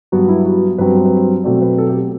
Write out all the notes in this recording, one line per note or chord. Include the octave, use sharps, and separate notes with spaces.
G2 F#3 B3 F#4
E4
F#4
G2 F#3 C4 B4
C5
B4
C5
B2 F#3 A3 C4 D5
B4
A4
G4
F#4